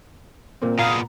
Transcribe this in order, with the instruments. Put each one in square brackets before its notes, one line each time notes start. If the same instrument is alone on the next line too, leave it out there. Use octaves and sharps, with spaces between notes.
[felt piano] A#2 A#3 C4
[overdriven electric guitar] A#2 B3 [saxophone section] G#4 F5 [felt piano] A#5